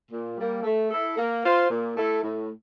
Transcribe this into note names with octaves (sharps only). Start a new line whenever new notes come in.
A#2
G3 A#3
A3
E4 A4
A#3
F4 C5
A#2
A3 E4 A4
A2